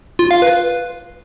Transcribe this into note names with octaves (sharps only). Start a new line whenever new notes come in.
F4
F5
B4